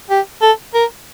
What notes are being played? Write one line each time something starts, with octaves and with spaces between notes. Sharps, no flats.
G4
A4
A#4